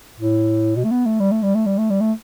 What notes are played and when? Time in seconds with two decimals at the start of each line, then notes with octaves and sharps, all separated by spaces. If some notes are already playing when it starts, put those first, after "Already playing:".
0.20 A2
0.76 B2
0.84 A3
0.91 B3
1.06 A3
1.20 G3
1.32 A3
1.43 G3
1.55 A3
1.66 G3
1.78 A3
1.90 G3
2.01 A3